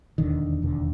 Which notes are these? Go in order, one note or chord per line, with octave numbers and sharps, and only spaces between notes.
E1 D#2 D3 D#3
E1 D#2 D3